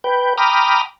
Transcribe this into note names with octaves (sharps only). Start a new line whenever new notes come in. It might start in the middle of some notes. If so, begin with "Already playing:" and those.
B4 G5
G5 A#5 B5 D6 D#6 F6